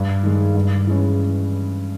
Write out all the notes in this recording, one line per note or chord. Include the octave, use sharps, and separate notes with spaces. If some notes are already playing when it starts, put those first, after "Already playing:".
Already playing: G2
D#3 G#3
G2
E3 G#3 C#4